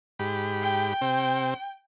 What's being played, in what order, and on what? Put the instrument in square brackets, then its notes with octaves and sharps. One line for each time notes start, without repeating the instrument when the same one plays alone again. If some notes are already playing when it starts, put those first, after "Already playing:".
[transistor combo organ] G#2 G4 B5
[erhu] G5
[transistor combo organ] C3 C4